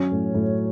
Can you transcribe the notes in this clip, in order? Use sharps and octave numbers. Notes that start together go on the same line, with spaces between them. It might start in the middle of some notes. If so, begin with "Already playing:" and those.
Already playing: F#3 C#4 C#5
A2
A2